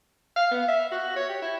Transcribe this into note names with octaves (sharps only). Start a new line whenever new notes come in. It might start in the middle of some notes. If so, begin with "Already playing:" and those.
F5
B3
E5
F#4
C#5
G4
E4